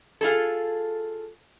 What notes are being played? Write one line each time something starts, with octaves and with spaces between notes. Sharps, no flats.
F4 G#4 A4